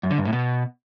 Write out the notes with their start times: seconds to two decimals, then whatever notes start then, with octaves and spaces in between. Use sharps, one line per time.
0.03 F#2
0.11 D3
0.18 G2
0.25 A2
0.33 B2